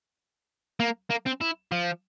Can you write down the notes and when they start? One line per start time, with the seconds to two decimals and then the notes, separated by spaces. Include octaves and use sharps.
0.80 A#3
1.10 A#3
1.26 C4
1.41 E4
1.72 F3